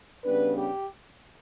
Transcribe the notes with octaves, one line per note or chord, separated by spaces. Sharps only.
C#3 G3 B3 D4 B4
G4